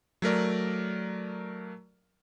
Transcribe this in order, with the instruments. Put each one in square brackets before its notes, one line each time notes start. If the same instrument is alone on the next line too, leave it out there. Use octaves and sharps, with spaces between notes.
[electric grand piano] F#3 A3 A#4 D5